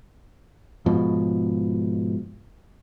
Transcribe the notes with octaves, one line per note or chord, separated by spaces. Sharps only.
G#2 B2 F3